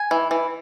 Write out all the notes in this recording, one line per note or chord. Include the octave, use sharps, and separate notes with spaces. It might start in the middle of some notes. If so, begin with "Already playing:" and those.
Already playing: G#5
E3
E3